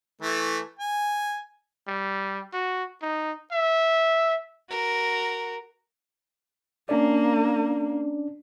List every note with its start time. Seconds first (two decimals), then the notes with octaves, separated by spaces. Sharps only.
0.22 E3 A3
0.79 G#5
1.88 G3
2.53 F#4
3.02 D#4
3.52 E5
4.70 F#4 A#4
6.89 A#3 C#4 D4 D5